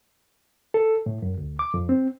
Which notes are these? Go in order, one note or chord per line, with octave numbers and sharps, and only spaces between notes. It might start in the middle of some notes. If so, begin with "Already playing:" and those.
A4
A2
F#2
D2
D6
F2
C4